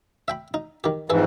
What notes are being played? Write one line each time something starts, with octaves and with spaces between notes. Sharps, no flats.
E5 G5 B5
D#4
D#3 G4
F2 G#2 E3 G#4 B4 E5